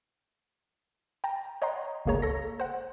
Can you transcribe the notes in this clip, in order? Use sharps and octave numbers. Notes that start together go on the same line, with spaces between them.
G5 A5 A#5
C#5 D#5 F#5 G5 A#5 C6
G1 C#2 A#3 G#4 C#5 A#5
A4 A#6
C5 F#5